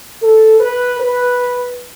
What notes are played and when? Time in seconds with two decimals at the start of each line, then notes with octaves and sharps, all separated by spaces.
0.22 A4
0.60 B4
1.00 B4